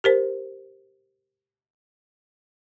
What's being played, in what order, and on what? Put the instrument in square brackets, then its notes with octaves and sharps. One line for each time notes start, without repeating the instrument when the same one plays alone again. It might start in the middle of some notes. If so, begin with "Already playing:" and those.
[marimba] G4 A#4 C5